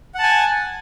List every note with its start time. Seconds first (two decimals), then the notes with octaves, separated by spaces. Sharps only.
0.14 F#5
0.19 A5
0.23 G#5